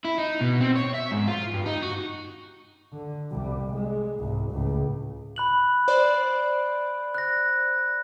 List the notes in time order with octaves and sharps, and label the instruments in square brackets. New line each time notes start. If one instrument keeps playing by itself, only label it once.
[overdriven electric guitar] E4
D#4
B2
C4
C#5
E5
G#2
F4
G2
D#4
F#4
[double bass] D3
C2 G3
G#3
C2 G#2
C#2 A2
[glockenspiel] B5 F#6 F#7
[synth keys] C5 D5
[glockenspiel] F#6 A#6